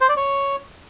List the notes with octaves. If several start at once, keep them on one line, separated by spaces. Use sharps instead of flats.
C5
D5
C#5